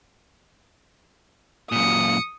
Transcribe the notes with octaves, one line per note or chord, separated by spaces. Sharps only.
F#2 A#2 D#6 C#7